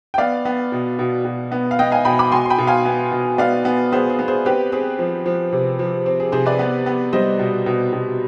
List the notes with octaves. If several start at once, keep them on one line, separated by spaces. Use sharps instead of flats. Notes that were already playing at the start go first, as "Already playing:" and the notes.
G5
B3 D5 F5
B3
B2
B2
B2
B3
F5
B3 D#5 G5
F5 G#5
B2 G5 B5
B5 D6
B2 G#5 C6
C6
G5 B5
B2
F5 G#5
B3
B2
B3 D5 F5
B3
B3 G#4 C5
G#4
B3
G#4 C5
C4 G4 B4
C4 G#4
F3
F3
C3
F3
C4
G#4
C3 G#4 C5
B4 D5
B3
B3
G3 C5 D#5
B2
B2
B2